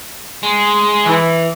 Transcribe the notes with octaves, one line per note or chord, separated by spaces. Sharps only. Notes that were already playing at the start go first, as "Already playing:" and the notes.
G#3
E3